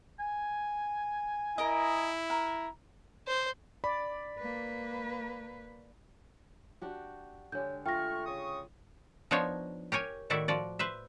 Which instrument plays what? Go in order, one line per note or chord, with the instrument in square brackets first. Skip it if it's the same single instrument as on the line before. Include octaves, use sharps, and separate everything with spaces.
[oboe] G#5
[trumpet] E4 [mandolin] A#4 D#5
[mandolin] A#4
[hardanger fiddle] C5
[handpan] D5 [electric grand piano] B5
[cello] A#3 B4
[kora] D4 F#4 G4
[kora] D3 G#3 G4 [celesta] C#5 G6
[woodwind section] A3 C#6 F6 [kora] F4 [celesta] G5 A#6
[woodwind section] C#3 C#6 D#6
[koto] F3 B3 D4 D#4 C5 C#5
G4 A#4 C#5 G#5
A2 D#3 E4 F#4 D5 E5
F3 F#4 D5
B4 C5 E5